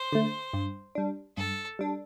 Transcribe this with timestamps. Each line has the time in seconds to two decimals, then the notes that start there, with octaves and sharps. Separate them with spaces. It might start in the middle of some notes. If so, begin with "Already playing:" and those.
Already playing: C5
0.12 D3 A3
0.53 G2
0.95 G3 D4
1.37 G2 A4
1.79 G3 D4